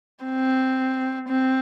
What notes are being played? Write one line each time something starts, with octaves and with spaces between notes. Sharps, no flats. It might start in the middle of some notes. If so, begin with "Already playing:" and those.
C4
C4